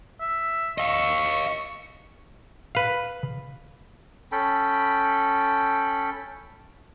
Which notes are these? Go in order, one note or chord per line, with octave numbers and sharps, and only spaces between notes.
E5
D#5 F5 C#6
B4 F5
C#4 A4 G5 B5